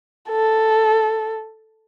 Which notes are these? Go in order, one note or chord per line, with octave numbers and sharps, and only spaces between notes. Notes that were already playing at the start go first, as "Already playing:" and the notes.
A4